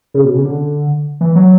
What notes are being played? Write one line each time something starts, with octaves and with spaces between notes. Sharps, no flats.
C#3
B2
C#3
D3
E3
F#3